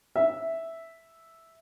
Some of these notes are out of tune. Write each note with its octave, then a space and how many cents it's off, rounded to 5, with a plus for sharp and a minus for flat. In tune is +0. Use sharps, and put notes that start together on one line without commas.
E5 -5